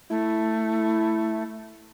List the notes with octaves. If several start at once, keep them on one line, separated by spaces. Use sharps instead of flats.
A3 E4